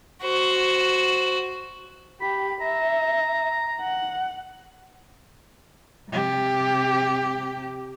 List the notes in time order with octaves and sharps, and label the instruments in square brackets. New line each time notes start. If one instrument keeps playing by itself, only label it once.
[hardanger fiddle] F#4 C5
[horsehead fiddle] G4 [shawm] B5
[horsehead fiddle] E5 [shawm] A#5
[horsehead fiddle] F#5
[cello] C3 G4